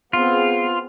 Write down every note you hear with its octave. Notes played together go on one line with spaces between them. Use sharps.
B3 C4 F4 G#4